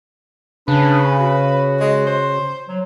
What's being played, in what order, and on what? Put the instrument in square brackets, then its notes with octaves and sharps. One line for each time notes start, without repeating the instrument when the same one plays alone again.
[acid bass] C#3 [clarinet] D4 [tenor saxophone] B4
[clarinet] F#4
[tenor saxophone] G#3
C5
[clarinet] F#3